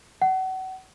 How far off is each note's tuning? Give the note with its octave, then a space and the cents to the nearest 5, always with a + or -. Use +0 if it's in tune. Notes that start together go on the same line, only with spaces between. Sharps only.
F#5 +30